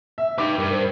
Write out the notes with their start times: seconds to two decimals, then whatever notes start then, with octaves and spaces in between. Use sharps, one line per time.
0.18 E5
0.38 D#4 G4 B4 D6
0.58 G2 A#4
0.72 C5